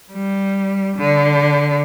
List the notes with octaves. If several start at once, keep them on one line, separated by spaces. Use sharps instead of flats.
G3
D3